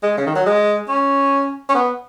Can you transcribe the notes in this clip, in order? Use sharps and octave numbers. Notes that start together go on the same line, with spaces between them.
G#3
C#3
D#3
F#3
G#3
C#4
C#4
B3